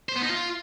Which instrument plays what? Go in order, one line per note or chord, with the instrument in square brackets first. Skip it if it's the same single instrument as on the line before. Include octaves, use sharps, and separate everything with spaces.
[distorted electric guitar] C5
B3
D#4
F4